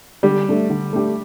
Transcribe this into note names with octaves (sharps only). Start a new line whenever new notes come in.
D3 G3
A3 D4 G4
D3
A3 D4 G4